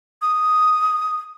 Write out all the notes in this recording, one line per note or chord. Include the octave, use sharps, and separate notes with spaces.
D#6